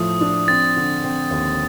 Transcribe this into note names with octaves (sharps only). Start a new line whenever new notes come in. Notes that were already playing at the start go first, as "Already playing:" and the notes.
Already playing: A2 F3 A3 D#6
D4
C4 A6
D3
C4
D#2